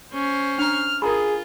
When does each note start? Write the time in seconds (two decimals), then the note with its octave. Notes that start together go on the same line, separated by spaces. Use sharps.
0.14 C#4 C5
0.58 D4 A#5 F6
1.02 F4 G#4 A#4 A#5 B5